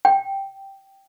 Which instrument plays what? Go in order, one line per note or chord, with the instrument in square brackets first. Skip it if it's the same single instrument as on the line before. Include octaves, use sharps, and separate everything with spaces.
[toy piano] G5